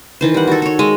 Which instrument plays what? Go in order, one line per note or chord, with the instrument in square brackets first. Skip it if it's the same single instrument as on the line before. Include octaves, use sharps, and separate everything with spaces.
[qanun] D#3 E3 C5
G3 F#5
F#4 A4
A4 C#5
G#3